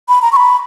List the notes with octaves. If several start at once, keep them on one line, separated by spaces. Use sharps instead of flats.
B5
A#5
C#6
B5